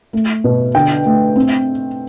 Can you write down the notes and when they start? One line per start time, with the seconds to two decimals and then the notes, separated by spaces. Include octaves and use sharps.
0.13 A3
0.44 B2
0.75 D3 G5
1.06 A3
1.36 C4